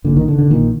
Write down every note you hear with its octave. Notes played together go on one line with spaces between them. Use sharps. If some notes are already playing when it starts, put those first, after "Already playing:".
A#1 A#2 D3
D#3
D3
D3
A#1 A#2 D#3